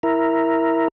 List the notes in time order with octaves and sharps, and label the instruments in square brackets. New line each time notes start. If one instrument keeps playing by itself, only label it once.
[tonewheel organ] E4 A#4